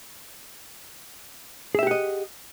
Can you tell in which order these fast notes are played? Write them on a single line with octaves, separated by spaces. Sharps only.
G#4 E5 G4 F#5 D#5